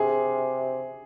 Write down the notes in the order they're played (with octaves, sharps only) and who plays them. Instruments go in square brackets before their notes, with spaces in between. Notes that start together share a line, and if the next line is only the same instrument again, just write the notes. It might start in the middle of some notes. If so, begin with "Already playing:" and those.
Already playing: [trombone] C3 [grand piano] G#4